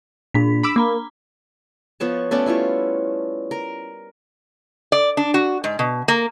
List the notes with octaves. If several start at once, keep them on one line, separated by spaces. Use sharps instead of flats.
A#2 D4 B6
B5 D6 E6
A#3 A#5 B5 D6
F3 B3 C#5 A5
A3 B3 C#4 D5
G3 E4 F4 C#5
A#4
D5
D4
F#4
G#2
B2
A#3